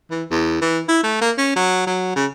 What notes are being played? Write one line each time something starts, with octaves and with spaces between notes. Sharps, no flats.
E3
E2
E3
E4
A3
A#3
C#4
F#3
F#3
C#3